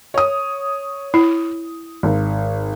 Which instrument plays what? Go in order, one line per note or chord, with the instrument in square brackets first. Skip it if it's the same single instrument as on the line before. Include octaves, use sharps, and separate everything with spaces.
[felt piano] C#5 D#6
[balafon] E4
[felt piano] G#1